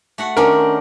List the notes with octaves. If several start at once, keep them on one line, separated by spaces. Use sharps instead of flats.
A3 F#4 F#5
D#3 C#4 D4 A#4